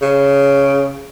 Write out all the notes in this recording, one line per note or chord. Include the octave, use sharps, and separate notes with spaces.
C#3